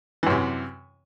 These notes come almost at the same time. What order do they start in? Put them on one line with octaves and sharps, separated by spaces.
E3 F#2 C3